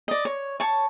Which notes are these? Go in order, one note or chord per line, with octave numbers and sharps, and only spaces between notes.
D5 D#5
C#5
C#5 A5 C#6